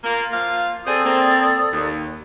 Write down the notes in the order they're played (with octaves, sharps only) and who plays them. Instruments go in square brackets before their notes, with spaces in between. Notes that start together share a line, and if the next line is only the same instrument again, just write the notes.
[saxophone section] A#3 [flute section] F4
[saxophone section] F3 A#3 F5
[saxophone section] C4 G#4 [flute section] A4 D5 D#6
[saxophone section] A#3 C4
D#2